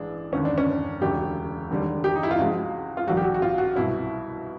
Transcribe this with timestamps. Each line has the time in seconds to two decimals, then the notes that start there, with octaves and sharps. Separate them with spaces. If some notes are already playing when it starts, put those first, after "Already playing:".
Already playing: A1 E3 G#3 D4
0.32 E1 D#2 D3 C#4
0.45 D4
0.58 C#4
1.01 E1 D2 C#3 F#3 G4
1.70 E1 D#2 D3 G3
2.04 G4
2.15 D#4
2.23 E4
2.31 F4
2.38 C#2 C#3 F3 G#3 F#4
2.97 F4
3.07 A#1 G#2 D#3 G3 F#4
3.17 G4
3.24 F#4
3.34 F#4
3.42 F4
3.58 F#4
3.75 C2 B2 F#3 E4